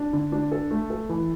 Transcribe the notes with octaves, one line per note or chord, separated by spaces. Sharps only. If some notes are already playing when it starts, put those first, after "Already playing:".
Already playing: D4
D3
D4
A4
A3
A4
E3